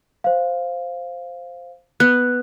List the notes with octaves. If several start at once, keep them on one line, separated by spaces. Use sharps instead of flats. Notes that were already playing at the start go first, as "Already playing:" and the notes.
C5 F5
B3 F#6